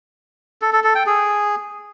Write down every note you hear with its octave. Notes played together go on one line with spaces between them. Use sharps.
A4
A4
A4
G5
G#4